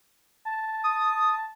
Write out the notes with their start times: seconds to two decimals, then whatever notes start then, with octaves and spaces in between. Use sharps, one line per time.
0.45 A5
0.84 D#6